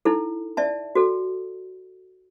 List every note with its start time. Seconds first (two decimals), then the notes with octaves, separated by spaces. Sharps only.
0.05 D#4 E4 A4
0.57 D5 E5 A5
0.95 F#4 A4